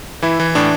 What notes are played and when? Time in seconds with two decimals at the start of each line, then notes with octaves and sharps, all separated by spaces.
0.22 E3 E4
0.40 E3
0.55 A2 D4